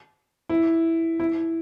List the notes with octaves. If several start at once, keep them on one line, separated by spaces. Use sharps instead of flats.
E4
E4